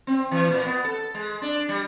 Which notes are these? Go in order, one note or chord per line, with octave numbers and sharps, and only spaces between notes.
C4
E3
A#2
B3
A4
G#3
D4
G3